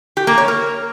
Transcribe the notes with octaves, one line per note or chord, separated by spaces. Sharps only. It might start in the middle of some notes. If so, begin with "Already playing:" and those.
G4
A#3
C#5
A#4